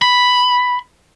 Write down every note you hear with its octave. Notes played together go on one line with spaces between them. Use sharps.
B5